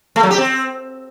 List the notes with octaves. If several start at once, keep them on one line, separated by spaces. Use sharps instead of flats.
A3
F#3
G4
C4